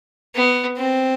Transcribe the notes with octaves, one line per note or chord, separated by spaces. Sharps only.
B3
C4